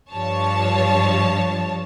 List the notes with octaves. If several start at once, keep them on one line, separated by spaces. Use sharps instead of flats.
G2 F3 C#5 A5